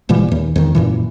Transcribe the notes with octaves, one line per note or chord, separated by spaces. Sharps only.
D#1 A#2 E3 G3
D#2
E2 D#3
F#2 A#2 E3